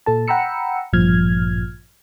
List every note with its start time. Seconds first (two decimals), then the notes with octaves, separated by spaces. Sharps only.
0.06 A#2 A4 A5
0.28 F#5 G5 A#5 B5 E6 C#7
0.93 A1 G2 A#2 F3 F6 G#6